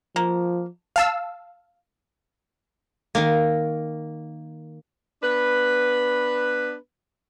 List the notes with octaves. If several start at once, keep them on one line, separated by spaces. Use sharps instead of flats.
F3 A#3
F5 A5 E6
D#3 A#3
B3 D4 B4